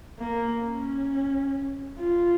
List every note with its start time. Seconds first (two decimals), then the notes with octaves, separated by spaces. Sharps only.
0.19 A#3
0.64 C#4
1.98 F4